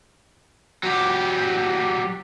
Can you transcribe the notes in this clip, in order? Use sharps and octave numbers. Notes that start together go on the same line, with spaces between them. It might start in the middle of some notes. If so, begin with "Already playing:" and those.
F#3 G4